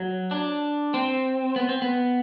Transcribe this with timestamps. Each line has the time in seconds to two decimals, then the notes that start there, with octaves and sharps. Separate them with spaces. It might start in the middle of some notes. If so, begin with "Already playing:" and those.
Already playing: F#3
0.31 D4
0.94 C4
1.56 B3
1.69 C4
1.82 B3